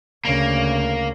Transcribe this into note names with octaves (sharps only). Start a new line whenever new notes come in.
D2 C#3 A#3